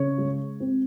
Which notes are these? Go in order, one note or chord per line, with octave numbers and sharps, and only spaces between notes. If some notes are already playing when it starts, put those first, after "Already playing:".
Already playing: C#3 C#5
G#3
C4